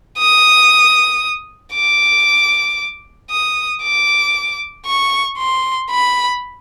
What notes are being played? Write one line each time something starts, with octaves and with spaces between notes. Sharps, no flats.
D#6
D6
D#6
D6
C#6
C6
B5